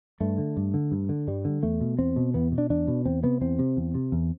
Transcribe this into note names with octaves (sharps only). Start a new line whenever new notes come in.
G2 A3
D3
G2
D3
G2
D3
G2 G3
D3
E2 A3
B2
E2 C4
B2
E2 B3
B2
D4
E2 D4
B2
E2 C4
C3 B3
E2 C4
C3
E2
C3
E2